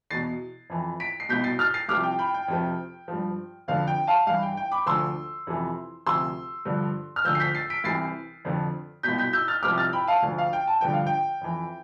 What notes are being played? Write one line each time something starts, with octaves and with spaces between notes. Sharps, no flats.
E2 B2 A6 C7
F2 E3
B6 D7
C7
C2 B2 G6 B6
A6 C7
F6 A6
A6 C7
C2 C3 F3 D6 F6
G5
G5 B5
G5
F2 C3 F3
G2 F3
F2 D3 F3 F5
G5
F5 A5
G2 E3 F5
G5
G5
B5 D6
D2 D3 F3 C6 E6
F2 C3 E3
D2 C3 F3 C6 E6
G2 D3 F3
F6
D2 D3 F3 E6 G6
C7
G6 B6
A6 C7
B6 D7
C2 C3 E3 A6 C7
F2 D3 F3
C2 B2 G6 B6
G6 B6
E6 G6
F6 A6
C2 C3 F3 D6 F6
F6 A6
G5 B5
F5 A5
D2 D3 F3
F5
G5
A5
G2 D3 F3 G5
F5
G5
F2 E3